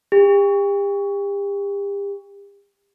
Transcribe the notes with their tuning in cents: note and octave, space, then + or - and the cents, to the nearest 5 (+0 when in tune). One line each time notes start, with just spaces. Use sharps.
G4 +40